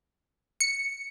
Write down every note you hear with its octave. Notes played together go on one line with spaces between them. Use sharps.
C#7